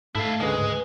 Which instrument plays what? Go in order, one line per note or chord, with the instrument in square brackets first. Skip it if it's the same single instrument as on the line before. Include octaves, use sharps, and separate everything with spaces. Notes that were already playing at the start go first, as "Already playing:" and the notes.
[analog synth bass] G#2 [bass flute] A3 [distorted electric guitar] E4 F5 [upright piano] A4
[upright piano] D2 C#3 [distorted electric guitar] G#3 [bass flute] B4